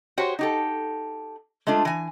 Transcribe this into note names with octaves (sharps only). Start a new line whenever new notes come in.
F#4 G4 C5 C#5
D#4 G4 A4
G#3 A3 D4 F4
E3 G#5